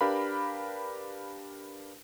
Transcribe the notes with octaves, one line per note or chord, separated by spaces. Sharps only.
D4 G4 A#4 B4 F5 B5